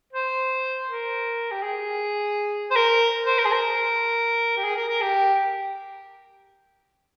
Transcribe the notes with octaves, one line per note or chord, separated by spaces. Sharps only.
C5
A#4
G4
G#4
C5
A#4
C5
A#4
G#4
A#4
G4
G#4
A#4
A#4
G4